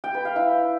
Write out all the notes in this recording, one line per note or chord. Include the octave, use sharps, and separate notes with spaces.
G5
B4
F5
E4